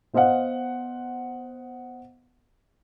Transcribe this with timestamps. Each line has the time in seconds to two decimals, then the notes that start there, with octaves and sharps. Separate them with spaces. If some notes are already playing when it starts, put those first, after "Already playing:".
0.13 B3 C5 D#5 F5 F#5